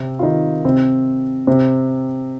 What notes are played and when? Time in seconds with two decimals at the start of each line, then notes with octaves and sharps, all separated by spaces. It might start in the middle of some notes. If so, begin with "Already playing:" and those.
Already playing: C3 C4
0.19 F4
0.23 D#3 D#4
0.65 C3 C4
1.47 C3 C4